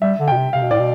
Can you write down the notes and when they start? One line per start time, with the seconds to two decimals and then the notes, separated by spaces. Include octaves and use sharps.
0.01 G3 E5
0.19 D3
0.28 G5
0.32 B2
0.36 C3
0.53 C3 F5
0.62 B2
0.71 A2 D5
0.79 B2